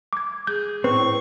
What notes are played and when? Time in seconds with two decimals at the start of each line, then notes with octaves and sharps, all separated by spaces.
0.13 D6 G#6
0.47 G#4 G6
0.84 A2 C4 B4 C#6